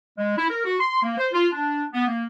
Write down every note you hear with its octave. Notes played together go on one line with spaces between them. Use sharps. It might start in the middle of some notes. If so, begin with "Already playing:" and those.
G#3
E4
A#4
F#4
C6
A#3
C5
F4
D4
B3
A#3